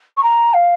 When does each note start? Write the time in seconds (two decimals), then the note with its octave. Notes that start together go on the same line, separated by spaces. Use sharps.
0.17 C#6
0.23 A#5
0.53 F5